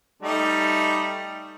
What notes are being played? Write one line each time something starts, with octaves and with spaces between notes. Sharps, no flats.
G3 A3 D#4